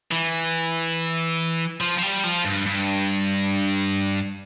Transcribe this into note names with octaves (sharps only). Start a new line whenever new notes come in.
E3
F3
F3
G3
F3
G2
G2